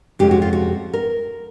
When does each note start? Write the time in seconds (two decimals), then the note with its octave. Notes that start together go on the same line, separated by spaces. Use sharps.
0.19 F2 C3 F3 G#3 C#4 G4
0.31 F#4
0.42 F4
0.53 F#4
0.93 A#4